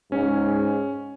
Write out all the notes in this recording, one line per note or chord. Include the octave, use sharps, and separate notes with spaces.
G#2 C#4